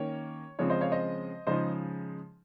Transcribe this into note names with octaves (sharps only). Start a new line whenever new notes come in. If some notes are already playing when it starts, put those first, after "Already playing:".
Already playing: D#3 A#3 C#4 C#5
C#3 F3 G#3 C4 C#5
C5 D#5
C#5 F5
C5 D#5
C#3 F3 G#3 D#4 C5 D#5